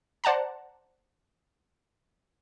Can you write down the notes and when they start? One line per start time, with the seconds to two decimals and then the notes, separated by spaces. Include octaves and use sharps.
0.24 C5 D5 F#5 A5 A#5